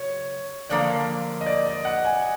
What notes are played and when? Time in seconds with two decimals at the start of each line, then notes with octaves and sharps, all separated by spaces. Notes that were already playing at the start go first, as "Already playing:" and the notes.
Already playing: C#3 F#3 C#5
0.69 D3 F3 A#3 D5
1.41 D#5
1.46 D5
1.66 D#5
1.85 F#5
2.05 G#5